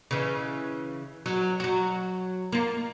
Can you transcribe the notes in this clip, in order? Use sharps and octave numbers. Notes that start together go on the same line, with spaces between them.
C#3 E3
F#3
F#3 F#4
A#3 F4